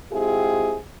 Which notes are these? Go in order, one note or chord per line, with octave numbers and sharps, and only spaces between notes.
G#3 C4 E4 F4 G4 G#4